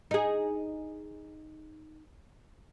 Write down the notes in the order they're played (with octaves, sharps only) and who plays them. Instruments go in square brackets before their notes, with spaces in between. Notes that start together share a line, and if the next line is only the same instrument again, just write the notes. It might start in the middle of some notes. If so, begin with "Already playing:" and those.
[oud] D#4 G#4